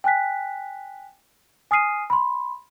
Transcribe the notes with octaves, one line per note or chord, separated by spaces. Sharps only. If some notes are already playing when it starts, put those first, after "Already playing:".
G5 G#5 F#6 B6
G#5 D#6 F6 C7 D#7
B5 C6